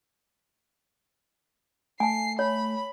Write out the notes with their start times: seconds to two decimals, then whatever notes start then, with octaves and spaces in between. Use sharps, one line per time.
2.00 A3 G#5 A5 C7
2.39 C#5 B5